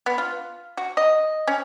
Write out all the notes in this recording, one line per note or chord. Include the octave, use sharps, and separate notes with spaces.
B3
F4
F#4
D#5
C#4